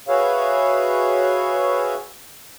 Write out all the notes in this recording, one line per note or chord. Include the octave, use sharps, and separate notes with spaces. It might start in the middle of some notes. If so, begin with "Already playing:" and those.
F#4 G#4 B4 C#5 E5 F5